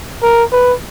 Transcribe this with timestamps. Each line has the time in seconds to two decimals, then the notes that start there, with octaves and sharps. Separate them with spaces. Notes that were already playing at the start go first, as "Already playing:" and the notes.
0.23 A#4
0.52 B4